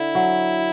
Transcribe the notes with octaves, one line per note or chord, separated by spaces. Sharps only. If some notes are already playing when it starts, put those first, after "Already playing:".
Already playing: D3 E4
F#3